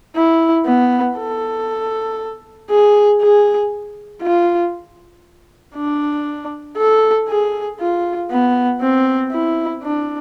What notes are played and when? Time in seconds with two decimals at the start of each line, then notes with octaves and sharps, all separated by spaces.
0.16 E4
0.66 B3
1.17 A4
2.70 G#4
3.22 G#4
4.22 F4
5.76 D4
6.78 A4
7.28 G#4
7.80 F4
8.31 B3
8.82 C4
9.32 E4
9.83 D4